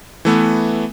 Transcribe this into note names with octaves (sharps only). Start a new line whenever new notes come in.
E3 A3 B3